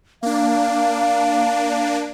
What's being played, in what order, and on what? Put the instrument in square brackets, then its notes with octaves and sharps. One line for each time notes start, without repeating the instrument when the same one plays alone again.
[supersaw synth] A#3 D4 [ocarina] F5